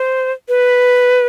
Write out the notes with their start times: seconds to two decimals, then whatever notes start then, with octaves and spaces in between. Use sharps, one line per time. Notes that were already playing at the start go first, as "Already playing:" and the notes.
Already playing: C5
0.49 B4